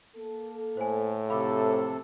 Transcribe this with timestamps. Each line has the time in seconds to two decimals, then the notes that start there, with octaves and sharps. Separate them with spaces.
0.16 A#3 A4
0.77 A2 C5 G#5
1.29 A#1 C3 E3 F3 A4 F5 B5 D6